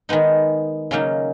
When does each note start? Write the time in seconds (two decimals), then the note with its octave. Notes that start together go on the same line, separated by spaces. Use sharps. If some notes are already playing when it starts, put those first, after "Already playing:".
0.09 D#3 G#3 B3 D#4
0.91 C#3 F#3 A#3 D#4